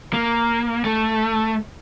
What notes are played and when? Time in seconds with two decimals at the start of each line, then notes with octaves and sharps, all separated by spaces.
0.13 A#3
0.84 A3